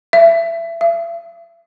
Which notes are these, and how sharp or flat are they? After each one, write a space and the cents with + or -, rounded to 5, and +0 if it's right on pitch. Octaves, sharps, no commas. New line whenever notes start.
E5 +25
E5 +45